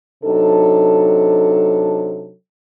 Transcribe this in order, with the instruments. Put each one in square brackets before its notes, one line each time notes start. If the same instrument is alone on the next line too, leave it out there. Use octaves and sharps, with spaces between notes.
[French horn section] C3 F#3 D4 D#4 A4